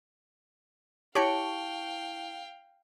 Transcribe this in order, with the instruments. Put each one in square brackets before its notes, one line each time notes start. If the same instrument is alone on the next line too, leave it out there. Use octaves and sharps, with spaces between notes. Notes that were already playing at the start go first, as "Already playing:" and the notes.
[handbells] E4 A5 C#6 [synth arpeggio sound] G4 C#5 C#7 [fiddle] F5 G5